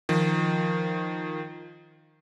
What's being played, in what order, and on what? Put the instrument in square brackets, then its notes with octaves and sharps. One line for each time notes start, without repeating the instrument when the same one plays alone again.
[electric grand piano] D#3 F3